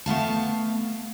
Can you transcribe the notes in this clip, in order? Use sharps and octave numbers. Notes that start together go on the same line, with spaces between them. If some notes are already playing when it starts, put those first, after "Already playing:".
A3 B3 F5 A5